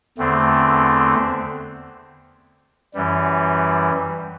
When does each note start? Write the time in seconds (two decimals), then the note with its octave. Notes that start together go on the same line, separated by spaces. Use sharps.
0.17 E2 D3 A3 C4
2.94 F#2 E3 G3